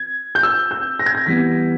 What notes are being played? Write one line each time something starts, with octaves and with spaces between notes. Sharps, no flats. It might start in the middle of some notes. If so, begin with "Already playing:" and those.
Already playing: G#6
G6
E6
G6
A#6
G#6
A#6
E3 G3 B3 B6